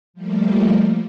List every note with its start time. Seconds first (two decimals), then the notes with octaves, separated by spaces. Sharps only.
0.14 F3 G3 A3 A#3